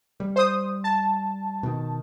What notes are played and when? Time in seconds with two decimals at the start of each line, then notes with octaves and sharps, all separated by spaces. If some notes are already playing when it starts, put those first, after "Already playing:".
0.20 G3
0.36 C5 D#6
0.84 A5
1.63 B2 D#3